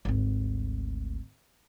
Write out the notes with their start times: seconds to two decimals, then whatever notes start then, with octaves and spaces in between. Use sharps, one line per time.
0.05 G#1 D2